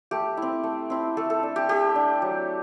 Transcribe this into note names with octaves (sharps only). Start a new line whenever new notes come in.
A3 G4
C4 E4
A3
C4 E4
A3 A4
A4
D4
G4
A3 G4
D4
F#3